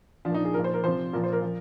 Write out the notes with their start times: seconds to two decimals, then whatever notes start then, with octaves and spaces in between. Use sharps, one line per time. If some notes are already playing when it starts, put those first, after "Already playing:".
0.25 A#2 F3 D4
0.34 D#4
0.45 G#4
0.54 A#2 F3 A#4
0.64 C5
0.74 A#4
0.84 C3 F3 C5
1.13 A#2 F3 A#4
1.24 C5
1.33 A#4
1.42 F3